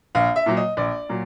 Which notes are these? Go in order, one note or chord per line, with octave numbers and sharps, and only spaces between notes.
A#1 F5
E5
A#2 F#3
D#5
A#1 D5
A#2 F#3